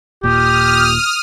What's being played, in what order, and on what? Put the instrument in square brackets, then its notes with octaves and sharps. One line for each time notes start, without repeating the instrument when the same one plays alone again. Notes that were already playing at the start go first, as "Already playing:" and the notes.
[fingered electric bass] D#1 A#2 [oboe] G4 [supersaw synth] D#6 F6